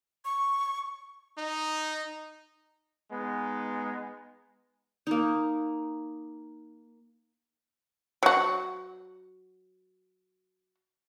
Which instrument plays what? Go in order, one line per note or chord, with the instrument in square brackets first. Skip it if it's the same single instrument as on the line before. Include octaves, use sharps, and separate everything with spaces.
[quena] C#6
[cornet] D#4
[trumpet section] G#3 B3 D#4
[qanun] A#3 D#4
[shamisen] F#3 F#4